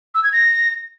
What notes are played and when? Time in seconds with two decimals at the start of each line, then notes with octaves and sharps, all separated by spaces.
0.15 E6
0.24 G#6
0.33 A#6